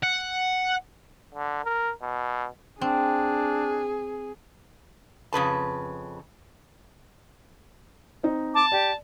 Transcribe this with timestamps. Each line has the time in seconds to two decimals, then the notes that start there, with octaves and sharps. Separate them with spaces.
0.03 F#5
1.35 D3
1.65 A#4
2.02 B2
2.81 C4 D4 G#4
5.33 F2 C#3 B4 A5
8.23 C4 D#4
8.55 A5 D6
8.72 G4 D5